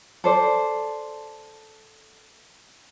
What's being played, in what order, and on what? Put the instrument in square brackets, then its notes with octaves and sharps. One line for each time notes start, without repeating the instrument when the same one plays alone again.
[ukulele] A4 C5 D5